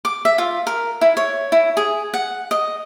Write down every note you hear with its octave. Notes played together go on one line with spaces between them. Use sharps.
D6
E5
F4
A#4
E4
C#5
E4
G#4
F#5
D#5